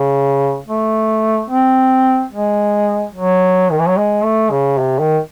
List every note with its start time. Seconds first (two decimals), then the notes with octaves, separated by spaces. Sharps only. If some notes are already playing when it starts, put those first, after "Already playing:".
Already playing: C#3
0.68 A3
1.50 C4
2.32 G#3
3.14 F#3
3.71 D#3
3.79 E3
3.88 F#3
3.97 G#3
4.24 A3
4.50 C#3
4.78 C3
5.00 D#3